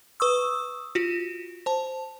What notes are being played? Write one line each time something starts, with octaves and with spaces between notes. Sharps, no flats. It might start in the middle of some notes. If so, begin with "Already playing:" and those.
B4 C#6 D#6 E6
F4 F#4
C5 A5